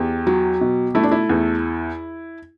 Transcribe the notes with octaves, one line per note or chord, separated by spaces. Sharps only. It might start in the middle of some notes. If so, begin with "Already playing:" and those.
Already playing: E2 G4
F#3
B2
A3 E4
D4
E4
E2